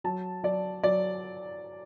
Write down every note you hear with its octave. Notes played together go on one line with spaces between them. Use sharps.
F#3 A5
F#3 D5
F#3 D5